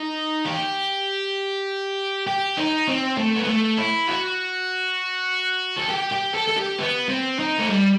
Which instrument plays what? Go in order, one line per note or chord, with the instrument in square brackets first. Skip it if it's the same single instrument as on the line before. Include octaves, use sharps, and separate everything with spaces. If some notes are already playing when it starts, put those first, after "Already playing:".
Already playing: [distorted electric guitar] D#4
G4
G4
D#4
C4
A3
B3
A3
E4
F#4
A4
G4
G4
A4
A4
G4
B3
C4
D#4
A3
G3